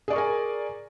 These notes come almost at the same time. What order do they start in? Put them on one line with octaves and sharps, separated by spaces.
G#4 D5 C#6 A#4 G#5